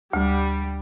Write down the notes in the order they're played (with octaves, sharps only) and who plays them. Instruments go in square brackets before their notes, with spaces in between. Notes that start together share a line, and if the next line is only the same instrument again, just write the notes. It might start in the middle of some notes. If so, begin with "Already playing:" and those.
[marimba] D2 [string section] G3